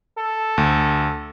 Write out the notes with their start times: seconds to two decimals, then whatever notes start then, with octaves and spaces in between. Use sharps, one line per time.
0.18 A4
0.58 D2